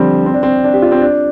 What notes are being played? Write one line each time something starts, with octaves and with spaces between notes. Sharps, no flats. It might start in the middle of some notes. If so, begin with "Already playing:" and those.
Already playing: D3 F3 G3 C4 F4
C4
D4
C4
D4
G4
F4
C4
D4